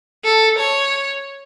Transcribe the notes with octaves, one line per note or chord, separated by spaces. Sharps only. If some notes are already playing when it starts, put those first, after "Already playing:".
A4
C#5